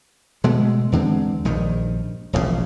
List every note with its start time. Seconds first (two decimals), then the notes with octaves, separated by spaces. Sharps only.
0.44 B2 G#3 A3
0.92 E2 D3 G#3 C4
1.45 A#1 G2 D#3
2.33 E1 A#1 A2 C#3